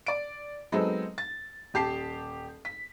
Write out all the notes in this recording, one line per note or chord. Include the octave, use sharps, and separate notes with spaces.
D5 D7
F#3 G#3 B3 C4 D#4 A4
A6
D#1 G4 A5 C7
B6